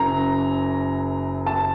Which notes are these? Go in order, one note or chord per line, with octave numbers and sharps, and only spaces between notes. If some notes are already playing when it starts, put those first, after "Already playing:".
Already playing: F#1 F#2 F#3 A#5
A5